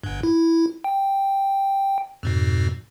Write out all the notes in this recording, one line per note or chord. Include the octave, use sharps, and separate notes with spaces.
G1 G2
E4
G5
F2 G#2 B2